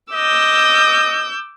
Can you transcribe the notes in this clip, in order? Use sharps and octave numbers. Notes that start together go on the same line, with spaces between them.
D#5 D6 E6 G6